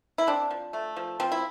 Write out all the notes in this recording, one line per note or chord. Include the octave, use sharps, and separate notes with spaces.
E4
C4 D4
F3
A3
F3
F3 C4
E4